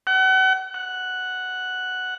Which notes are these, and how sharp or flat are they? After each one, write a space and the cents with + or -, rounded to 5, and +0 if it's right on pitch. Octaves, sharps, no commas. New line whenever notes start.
F#5 +35
F#5 +0